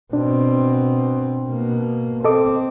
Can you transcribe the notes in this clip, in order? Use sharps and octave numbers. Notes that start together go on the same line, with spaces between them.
B2 C4 D4
B2 A#3
C4 A4 D#5 D6